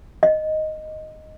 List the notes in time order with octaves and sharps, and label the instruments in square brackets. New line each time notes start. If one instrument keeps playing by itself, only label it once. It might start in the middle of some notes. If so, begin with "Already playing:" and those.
[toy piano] D#5